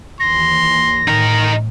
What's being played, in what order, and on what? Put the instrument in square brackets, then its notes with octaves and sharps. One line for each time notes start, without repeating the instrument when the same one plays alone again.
[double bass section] D#2 E3 [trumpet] C6 [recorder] A#6
[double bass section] A2 [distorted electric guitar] D#4 A#4